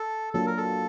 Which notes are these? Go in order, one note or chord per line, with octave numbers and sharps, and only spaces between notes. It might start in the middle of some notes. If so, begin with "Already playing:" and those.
Already playing: A4
F#3 A#3 D4 F4 A4
A#4
A4